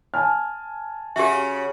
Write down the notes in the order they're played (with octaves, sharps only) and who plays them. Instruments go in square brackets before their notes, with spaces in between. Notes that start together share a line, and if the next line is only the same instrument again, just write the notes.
[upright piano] G#5 A5 F6
[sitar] C#3 F#4 [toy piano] G4 E5